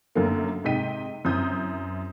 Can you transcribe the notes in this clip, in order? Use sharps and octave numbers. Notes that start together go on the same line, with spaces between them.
F#2 D3 F#3 A3 A#3
G#2 C3 D#5 G5 B6 D#7
F#2 C4 E4 D#6 G6